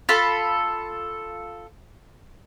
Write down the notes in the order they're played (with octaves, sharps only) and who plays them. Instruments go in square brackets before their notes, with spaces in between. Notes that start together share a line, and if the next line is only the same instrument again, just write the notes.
[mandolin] F4 A4 B5